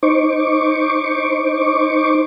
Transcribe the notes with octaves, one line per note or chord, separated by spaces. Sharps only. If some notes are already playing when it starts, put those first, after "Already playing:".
D#4 C5 C#6 D6